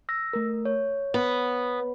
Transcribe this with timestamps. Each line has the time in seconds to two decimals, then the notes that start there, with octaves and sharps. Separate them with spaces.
0.09 E6 A#6
0.33 A3 A#4
0.65 C#5
1.14 B3